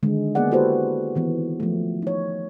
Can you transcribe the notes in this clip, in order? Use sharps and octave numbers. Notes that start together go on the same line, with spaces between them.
D3 D#3 G#3
A#3 B3 G#4 D5 F#5
E4 F#4 G4 A4 B4 C5
D#3 E3 B3
F3 A3
D#4 C#5